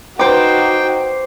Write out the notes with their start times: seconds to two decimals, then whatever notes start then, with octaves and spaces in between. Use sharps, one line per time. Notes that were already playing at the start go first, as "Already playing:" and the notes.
0.19 D#4 F#4 C5 G5 D6